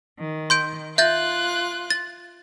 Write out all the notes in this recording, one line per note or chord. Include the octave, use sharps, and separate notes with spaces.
D#3
C6 G6 D7
F4 E5 F#6 G6 A6
A6